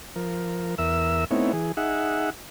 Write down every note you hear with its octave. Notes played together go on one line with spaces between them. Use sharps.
F3 A#4
E2 A#4 E5 E6
A3 B3 C4 D#4 E4 C#5
E3 G#4
D#4 G#4 E5 F#5